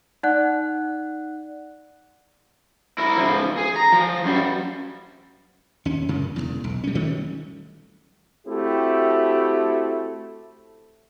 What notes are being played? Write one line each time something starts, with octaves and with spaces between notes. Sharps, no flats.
D#4 D5 F#5 F#6
E4 A#4
G#2 F3
G#4
A#5
F3
F#2 G3
D#2 C#4
F#2 C#3
E1 B1 E2
B1
G3 C#4
D#3 G3 A3 C#4
A3 C4 E4 F#4 G4